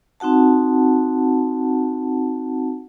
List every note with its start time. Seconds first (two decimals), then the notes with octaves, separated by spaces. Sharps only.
0.20 C4 D#4 F#4 F#5 A5